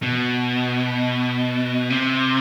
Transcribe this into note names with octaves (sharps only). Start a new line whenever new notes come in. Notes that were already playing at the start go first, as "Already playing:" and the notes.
B2
C3